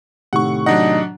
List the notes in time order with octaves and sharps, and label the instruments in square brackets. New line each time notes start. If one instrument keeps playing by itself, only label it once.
[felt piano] A2 C3 D#3 [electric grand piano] F#5 C#6
[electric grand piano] F#3 D4 F#5 [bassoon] D#4